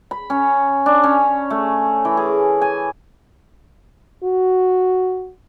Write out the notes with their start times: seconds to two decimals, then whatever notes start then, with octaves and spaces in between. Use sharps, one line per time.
0.11 B5
0.30 C#4
0.86 D4
1.04 C#4
1.50 A3
2.05 E3
2.17 G#4
2.62 G#5
4.24 F#4